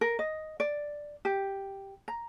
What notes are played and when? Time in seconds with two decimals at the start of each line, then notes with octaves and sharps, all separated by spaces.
0.01 A#4
0.19 D#5
0.60 D5
1.25 G4
2.08 A#5